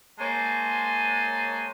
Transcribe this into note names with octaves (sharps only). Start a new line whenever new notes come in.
G#3 A#3 C5 C#5 G#5 A5